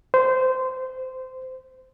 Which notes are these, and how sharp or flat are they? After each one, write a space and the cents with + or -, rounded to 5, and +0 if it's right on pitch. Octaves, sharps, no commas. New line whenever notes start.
C5 -20